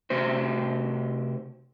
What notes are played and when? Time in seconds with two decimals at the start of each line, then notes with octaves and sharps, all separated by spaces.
0.10 C3 A3 F#4 C5